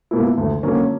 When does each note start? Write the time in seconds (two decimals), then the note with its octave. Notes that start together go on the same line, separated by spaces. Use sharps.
0.11 B2 A#3 E4
0.38 D2
0.63 D3 F#3 A#3 C#4